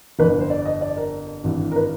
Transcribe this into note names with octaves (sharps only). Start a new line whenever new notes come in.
G1 F2 D3 B4
B4
C5
D5
D#5
D5
A#4
G#1 G2 E3
A#4
B4